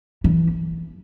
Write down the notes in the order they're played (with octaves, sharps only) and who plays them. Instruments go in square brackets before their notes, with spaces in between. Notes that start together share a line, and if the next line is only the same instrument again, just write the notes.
[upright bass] E3